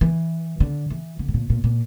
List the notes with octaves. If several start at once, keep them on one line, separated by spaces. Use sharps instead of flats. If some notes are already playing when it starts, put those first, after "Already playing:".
E3
D3
E3
D3
A2
A#2
A#2
A#2